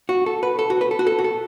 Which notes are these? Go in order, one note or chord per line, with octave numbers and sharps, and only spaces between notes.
F#4
A4
B4
A4
F#4
B4
A4
F#4
A4
F#4
A4